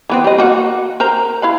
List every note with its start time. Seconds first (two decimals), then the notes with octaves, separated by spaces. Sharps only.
0.10 E3 B3 C4
0.24 G3 D#5
0.38 A#3 F#4 F#5
1.00 A#4 C5 A#5
1.42 E4 F5 B5